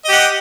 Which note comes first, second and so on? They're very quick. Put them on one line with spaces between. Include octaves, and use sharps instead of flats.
D#5 G4 F#5